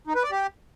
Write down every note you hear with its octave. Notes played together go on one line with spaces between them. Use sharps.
D#4
B4
D5
G4